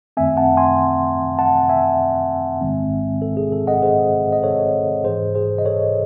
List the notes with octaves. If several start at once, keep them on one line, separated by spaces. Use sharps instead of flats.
F#2 D#3 A3 C4 E5 G#5
F#5 A5
G#5 C6
F#5 A5
E5 G#5
A1 G#2 D#3 G#3 C4
A4
G#4
A4
D#5 F#5
G#4 C5
D#5
A4 C#5
G#1 G#2 E3 G#4 C5
G#4 C5
D#5
A4 C#5